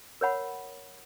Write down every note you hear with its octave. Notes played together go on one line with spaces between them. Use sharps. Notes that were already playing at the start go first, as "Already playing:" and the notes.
A#4 C#5 F#5 B5